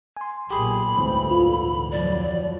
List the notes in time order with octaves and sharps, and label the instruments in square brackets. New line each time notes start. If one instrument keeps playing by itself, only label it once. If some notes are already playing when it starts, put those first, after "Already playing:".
[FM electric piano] G#5 C6
[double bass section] B1 A#2 [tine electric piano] G4 G#4 [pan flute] B5
[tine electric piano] D2 G#2 E3 [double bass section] G3 A3 C4
[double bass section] A#2 D3 [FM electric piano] F4
[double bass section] F2 F3 F#3 [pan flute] D5